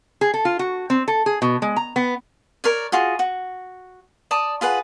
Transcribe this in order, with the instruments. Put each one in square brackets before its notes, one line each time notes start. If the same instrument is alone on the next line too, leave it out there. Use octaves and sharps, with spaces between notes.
[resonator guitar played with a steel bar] G#4
A4
F4
F#4
C4
A4
G#4
B2
G#3
A#5
B3
[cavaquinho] A#4 C#5 D5
F4 F#4 G#4
F#4
D5 A5 D#6
F4 G#4 B4 F#5